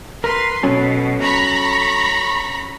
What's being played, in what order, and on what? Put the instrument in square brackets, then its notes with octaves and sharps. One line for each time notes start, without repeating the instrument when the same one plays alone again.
[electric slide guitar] A#4 [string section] B4 C6
[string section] B2 [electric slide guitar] F#3 C#4 A4
[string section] A#5 B5 C#6